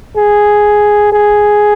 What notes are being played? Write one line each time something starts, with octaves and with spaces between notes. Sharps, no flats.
G#4
G#4